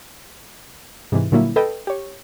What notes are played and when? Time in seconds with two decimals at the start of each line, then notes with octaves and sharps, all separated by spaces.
1.12 G#2 C3 E3
1.32 A#2 D3 F#3 G3 A#3 E4
1.56 A4 B4 D#5 G5
1.87 G4 C#5